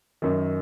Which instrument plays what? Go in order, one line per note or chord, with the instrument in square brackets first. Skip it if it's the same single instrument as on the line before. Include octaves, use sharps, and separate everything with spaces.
[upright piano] F#2 D#3